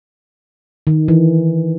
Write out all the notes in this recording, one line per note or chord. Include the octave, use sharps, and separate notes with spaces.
D#3
E3